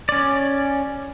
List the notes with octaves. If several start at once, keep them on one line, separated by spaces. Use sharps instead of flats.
C#4 D5